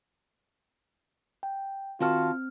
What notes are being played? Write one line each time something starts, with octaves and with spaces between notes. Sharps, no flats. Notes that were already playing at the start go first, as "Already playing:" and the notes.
G5
D#3 C4 F4 F#4 A5 F6